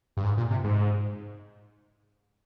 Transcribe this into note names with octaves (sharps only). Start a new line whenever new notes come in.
G2
G#2
A#2
C3
G#2